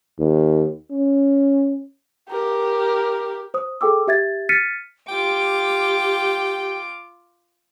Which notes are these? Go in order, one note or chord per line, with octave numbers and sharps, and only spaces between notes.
D#2
C#4
G4 A#4
C5 D#6
G#4 A4 G5 D6 E6
G4 E5 G#6 A6
F6 A6 B6 C#7 D#7
F4 G4 G5 D6